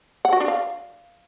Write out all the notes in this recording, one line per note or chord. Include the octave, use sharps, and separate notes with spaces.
F#5
F#4
D4
F5